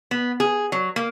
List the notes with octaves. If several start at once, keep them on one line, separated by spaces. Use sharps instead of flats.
B3
G#4
F#3
A#3